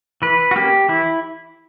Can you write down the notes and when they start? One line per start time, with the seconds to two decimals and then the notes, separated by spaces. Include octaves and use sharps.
0.22 E3 B4
0.51 F#4
0.56 A#3 C#4 G4
0.89 E3 E4